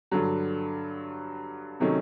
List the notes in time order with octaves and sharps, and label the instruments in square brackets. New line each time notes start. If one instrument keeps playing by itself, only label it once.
[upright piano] G2 D3 F#3
C3 D#3 F#3 A3 C#4